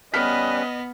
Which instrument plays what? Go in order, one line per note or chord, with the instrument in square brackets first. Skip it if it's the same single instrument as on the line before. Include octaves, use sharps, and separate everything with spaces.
[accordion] G3 C#4 B4 [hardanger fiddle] B3 [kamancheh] D#5 [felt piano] F6 B6